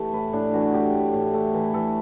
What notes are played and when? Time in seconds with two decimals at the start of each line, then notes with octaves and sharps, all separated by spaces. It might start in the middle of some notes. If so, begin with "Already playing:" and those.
Already playing: E3 A3 G4 A4
0.13 A2 B4
0.33 A2 D4
0.53 E3 F#4
0.73 A2 G4
0.93 A2
1.13 A2
1.34 A3
1.54 E3
1.74 E3 A4